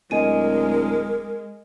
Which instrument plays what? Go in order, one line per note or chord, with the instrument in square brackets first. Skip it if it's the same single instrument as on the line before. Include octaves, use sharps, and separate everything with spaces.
[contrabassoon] D1 [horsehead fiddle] G#3 [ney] A#4 [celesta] D#5 G#5 D#7